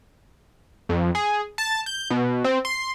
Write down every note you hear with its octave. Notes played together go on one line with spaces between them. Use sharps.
F2
G#4
A5
G6
B2
C4
C6